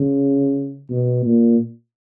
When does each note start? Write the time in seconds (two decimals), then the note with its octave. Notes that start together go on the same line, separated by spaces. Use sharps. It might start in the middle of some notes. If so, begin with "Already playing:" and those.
Already playing: C#3
0.90 B2
1.25 A#2